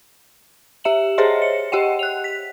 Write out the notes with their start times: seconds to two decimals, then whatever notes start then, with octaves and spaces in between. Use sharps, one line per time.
0.84 G4 E5 E7 F#7
1.18 G#4 C5 C#5 D#5 E5 C6
1.42 C#7
1.72 G4 D#5 F#5 G5
1.99 F#6 F7
2.24 B6